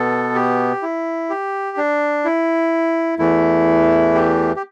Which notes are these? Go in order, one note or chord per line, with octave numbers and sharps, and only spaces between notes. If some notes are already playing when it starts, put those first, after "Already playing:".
Already playing: B2 B3 A4
G4
E4
G4
D4
E4
E2 E3 A3 E4
G4
G4